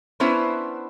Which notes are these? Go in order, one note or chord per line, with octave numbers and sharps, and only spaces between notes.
B3 C#4 D4 E4 B4 C5